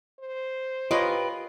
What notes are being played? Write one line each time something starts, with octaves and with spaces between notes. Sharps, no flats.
C5
F4 G4 A#4 B4 C#5 D#5